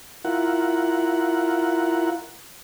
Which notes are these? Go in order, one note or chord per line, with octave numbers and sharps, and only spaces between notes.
E4 F4 A#4 F#5